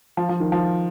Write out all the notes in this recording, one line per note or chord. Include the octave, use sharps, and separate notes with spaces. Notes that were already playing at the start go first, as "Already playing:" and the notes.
F3
F3
D#3
F3